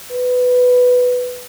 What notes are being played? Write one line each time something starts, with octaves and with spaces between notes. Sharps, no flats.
B4